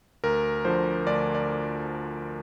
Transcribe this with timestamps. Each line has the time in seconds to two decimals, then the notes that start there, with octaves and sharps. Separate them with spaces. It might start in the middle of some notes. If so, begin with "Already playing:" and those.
0.24 D2 A#4
0.65 D3 F3 C5
1.07 D2 D5
1.35 D5